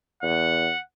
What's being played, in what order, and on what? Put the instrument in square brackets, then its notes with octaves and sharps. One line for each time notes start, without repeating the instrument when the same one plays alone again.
[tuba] E2 [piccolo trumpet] F#5